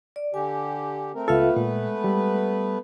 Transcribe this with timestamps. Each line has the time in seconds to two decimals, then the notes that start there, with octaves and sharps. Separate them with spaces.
0.16 D5
0.34 D3 G4 G#5
1.15 A3 C4 A#4
1.28 C#2 A3 B3 F4 A4 B4 E5 F5
1.56 A#2 G#3
2.04 G3